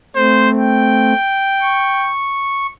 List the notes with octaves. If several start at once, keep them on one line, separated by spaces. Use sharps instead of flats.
A3 C4 C5
G5
C#6